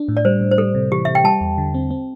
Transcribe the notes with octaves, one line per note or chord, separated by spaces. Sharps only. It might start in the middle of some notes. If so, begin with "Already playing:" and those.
Already playing: D4
A2
D5
G3 C5
A2
C5
G3 A4
C3
E3 G4
C3 E5
G5
G3 A5
E2
D3
C4
C4